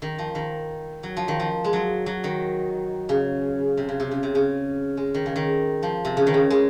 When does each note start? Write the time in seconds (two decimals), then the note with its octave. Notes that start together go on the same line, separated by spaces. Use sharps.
0.02 D#3
0.19 F3
0.35 D#3
1.03 F#3
1.17 F3
1.28 D#3
1.40 F3
1.64 G#3
1.73 F#3
2.06 F#3
2.24 D#3
3.09 C#3
3.77 C3
3.89 C#3
4.00 C3
4.11 C#3
4.23 C3
4.35 C#3
4.97 G#3
5.14 D#3
5.26 C#3
5.36 D#3
5.83 F3
6.05 C3
6.17 C#3
6.27 D#3
6.34 C#3
6.50 G#3